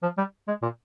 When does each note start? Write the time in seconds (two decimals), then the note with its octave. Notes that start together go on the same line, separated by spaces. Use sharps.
0.03 F3
0.18 G3
0.48 G#3
0.62 A#2